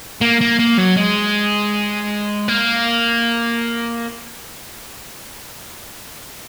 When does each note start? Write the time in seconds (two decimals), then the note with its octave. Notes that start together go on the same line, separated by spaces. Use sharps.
0.21 A#3
0.41 A#3
0.59 A#3
0.78 F#3
0.97 G#3
2.48 A#3